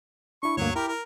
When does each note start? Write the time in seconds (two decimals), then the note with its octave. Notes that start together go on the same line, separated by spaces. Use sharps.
0.43 D4 E4 C#6
0.57 D2 G2 F#3 A#3 C#5
0.76 E4 G4 A#4
0.88 A#4